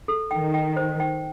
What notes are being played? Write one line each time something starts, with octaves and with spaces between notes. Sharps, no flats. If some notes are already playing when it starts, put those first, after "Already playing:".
A4
D#3 G5
G5
C5
G5